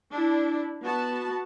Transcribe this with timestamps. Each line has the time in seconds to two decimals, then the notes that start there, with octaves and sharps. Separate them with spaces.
0.12 D4 E4
0.83 B3 F#4 A5